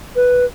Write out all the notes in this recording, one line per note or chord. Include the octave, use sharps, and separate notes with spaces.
B4